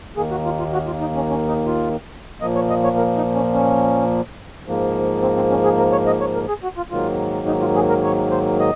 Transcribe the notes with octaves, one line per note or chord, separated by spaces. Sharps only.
D#2 D#3 A#3 G#4
F#4
F4
F4
F#4
F4
D#4
C#4
C#4
D#4
F4
A#2 F3 A#3 D#5
C#5
D#5
C#5
A#4
D#4
C#4
C#4
G#2 F3 A#3
C4
C4
C#4
G#4
A#4
C#5
D#5
C#5
A#4
G#4
F#4
F4
G#2 D#3 F#3 A#3 F4
D#4
F4
G#4
A#4
C#5
C5
D#5